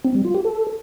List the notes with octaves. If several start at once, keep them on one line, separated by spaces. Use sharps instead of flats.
C4
G3
F4
G4
A4